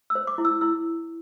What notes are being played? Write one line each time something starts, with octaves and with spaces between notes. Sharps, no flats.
E6
C5
D6
E4
E6
E4 E6